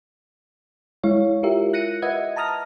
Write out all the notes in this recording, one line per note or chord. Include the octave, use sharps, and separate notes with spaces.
G#3 E4 C#5 F5
E4 F4 G4 A#4 E5
F#6 A#6 C#7 D#7
B4 D#5 E5 F#5 G#6
A5 A#5 D#6 F6 A#6